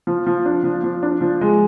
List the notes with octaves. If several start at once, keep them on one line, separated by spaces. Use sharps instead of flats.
F3
F3
D4
F3
F3
D4
F3
G#3